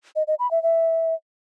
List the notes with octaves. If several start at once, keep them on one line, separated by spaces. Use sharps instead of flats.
D#5
D#5
B5
E5
E5